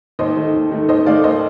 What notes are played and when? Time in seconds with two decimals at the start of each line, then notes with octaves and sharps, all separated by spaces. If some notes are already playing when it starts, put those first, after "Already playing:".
0.19 D#2 C5 D#5
0.36 D#3 A3
0.54 D#2
0.71 D#3 A3
0.89 D#2 C5 D#5
1.06 D#3 A3 D5 F5
1.23 D#2 C5 D#5